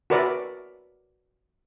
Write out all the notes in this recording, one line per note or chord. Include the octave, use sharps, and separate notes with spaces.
F#4 A#4 B4 D5 E5